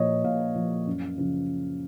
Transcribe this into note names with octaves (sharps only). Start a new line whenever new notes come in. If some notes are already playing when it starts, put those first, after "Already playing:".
Already playing: A#2 F3 C#5 D#5
A#2 F5
F3
F#2
C#3 F3